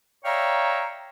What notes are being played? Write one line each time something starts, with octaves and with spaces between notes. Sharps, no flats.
C#5 D5 E5 F5 G5 A#5